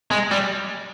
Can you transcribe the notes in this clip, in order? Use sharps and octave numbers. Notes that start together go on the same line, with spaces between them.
G#3
G3